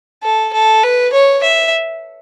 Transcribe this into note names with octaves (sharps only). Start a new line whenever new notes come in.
A4
A4
B4
C#5
E5